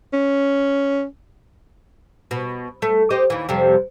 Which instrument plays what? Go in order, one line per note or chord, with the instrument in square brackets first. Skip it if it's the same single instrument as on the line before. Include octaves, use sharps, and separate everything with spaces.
[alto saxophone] C#4
[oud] B2
A3
G4 C5 D#5
D#2 E3
F2 C3 G3